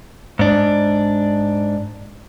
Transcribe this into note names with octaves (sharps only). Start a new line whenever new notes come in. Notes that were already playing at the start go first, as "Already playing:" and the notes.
G#2 D4